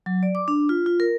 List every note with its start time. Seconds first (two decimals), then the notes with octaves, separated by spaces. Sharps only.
0.06 F#3
0.23 D5
0.35 D6
0.48 D4
0.69 F4
0.86 F4
1.00 A#4